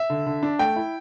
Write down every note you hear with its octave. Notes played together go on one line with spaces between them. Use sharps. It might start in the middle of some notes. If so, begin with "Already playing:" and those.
Already playing: E5
D3
D3
D4
A3 G5
E4